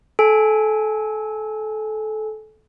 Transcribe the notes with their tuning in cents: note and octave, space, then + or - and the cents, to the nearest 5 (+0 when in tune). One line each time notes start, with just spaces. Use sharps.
A4 -25 G#5 +0